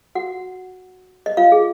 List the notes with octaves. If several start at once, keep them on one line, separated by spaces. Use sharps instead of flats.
F#4 F#5
D#5
F4 F5
G#4